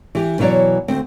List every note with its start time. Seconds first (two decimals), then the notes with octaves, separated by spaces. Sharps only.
0.15 E3 G4
0.39 B2 E3 F#3 C#5 D5
0.88 D2 C4